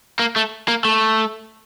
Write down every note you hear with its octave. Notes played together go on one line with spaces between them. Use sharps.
A#3
A3
A#3
A3